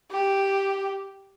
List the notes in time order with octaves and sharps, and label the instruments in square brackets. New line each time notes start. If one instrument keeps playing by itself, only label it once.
[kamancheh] G4